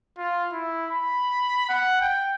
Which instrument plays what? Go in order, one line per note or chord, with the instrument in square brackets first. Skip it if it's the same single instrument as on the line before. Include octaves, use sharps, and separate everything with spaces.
[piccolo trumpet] F4
E4
B5
F#5
G5